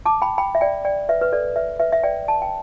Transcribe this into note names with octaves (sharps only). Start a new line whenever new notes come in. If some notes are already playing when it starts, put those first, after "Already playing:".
A5 D6
G5 B5
G5 B5
E5
D5 G5
D5 G5
B4 E5
B4
A4 D5
B4 E5
B4 E5
E5
D5 G5
A5
G5